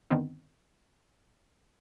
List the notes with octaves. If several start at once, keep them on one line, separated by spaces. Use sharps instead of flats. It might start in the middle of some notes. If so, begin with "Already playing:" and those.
G2 D3 D#3 B3 C4 D#4